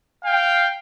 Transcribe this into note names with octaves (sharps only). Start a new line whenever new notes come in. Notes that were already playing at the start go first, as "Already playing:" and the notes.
F5 G5